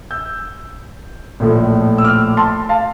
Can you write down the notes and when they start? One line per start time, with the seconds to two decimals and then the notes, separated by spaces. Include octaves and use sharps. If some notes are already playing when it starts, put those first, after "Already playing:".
0.11 E6 G6
1.40 A#1 A2 F3 A3
1.98 E6
2.04 D6 F6
2.37 A5 C6
2.69 F5 A5